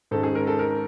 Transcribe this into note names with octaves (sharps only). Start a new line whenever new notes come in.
G#2 D#3 G#3 C#4 A4
G#4
A#4
A4
A#4